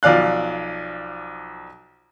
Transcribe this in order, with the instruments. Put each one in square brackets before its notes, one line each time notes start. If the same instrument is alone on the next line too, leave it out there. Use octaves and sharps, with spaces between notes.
[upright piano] B1 F3 D5 F5 F#6